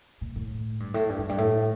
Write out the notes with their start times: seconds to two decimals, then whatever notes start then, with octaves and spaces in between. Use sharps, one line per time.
0.21 A#2
0.36 A2
0.80 G2
0.94 A2
1.09 G2
1.19 F2
1.29 G2
1.38 A2